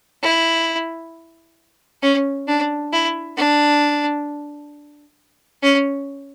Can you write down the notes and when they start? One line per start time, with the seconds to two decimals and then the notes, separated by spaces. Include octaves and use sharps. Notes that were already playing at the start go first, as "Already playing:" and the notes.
0.23 E4
2.02 C#4
2.48 D4
2.92 E4
3.37 D4
5.62 C#4